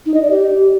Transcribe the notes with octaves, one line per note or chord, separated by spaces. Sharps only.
D#4
D#5
D5
G4